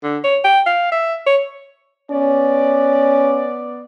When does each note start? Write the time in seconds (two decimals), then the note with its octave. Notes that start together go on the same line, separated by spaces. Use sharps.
0.03 D3
0.24 C#5
0.44 G5
0.66 F5
0.92 E5
1.26 C#5
2.11 B3 C#4 D5